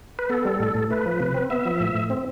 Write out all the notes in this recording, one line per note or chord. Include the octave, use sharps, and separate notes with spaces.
B4
B3 A4
G3
A2
A2
A3 B4
F3
C3
C4
B3 E5
F3
A2
A2
C4